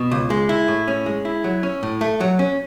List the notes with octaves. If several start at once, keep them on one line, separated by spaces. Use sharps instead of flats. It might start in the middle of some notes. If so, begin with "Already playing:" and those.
Already playing: B2
C#2
G#3
E4
A2
C#4
G#3
E4
F#3
C#4
A2
A3
F#3
C#4